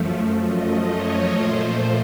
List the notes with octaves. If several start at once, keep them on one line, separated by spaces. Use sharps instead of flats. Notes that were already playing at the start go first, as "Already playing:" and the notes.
Already playing: F#2 F3 A3
D#5
C#5
A#2 F3 A3 C5